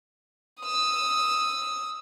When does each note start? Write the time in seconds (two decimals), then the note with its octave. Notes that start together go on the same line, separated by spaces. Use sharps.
0.62 D#6 E6